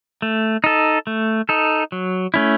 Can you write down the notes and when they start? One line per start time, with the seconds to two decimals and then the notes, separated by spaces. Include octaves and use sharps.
0.22 A3
0.64 D#4 A4
1.07 A3
1.49 D#4 A4
1.92 F#3
2.34 A3 C#4 E4